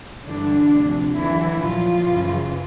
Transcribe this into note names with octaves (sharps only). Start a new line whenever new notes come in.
G2 D3 E3 G3 D4
D2 C3 F3
D#2 D3 E3 F#3 E4
A#2 F3 F#3 F4
F#2 C#3 E3